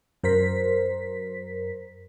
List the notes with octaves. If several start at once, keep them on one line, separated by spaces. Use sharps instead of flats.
F#2 A#4 C5 B6